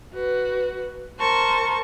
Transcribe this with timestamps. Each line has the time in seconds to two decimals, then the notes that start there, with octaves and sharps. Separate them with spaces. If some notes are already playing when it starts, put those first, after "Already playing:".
0.13 F#4 B4
1.19 A#4 C5 A5 C#6